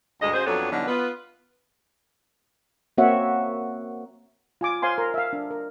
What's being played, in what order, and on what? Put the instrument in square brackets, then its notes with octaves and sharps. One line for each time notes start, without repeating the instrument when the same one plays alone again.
[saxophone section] D2 G2 G#3 D#5
C#3 F#4 G#4 C5
F2 F#3 B3 D4 A4 C#5
D3 E3 F#3 G3 B3 D#4
B3 F4 B4
[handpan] A#3 C4 F#4 C#5 E5 F#5
[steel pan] F4 G#5 D6
C5 F5 G#5 C6
A#4
E5 F5
D4
A#4